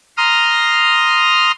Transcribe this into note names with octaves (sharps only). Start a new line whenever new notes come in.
A#5 C6 D#6 F6